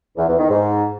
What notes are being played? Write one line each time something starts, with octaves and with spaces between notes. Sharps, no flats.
E2
E2
D#3
G#2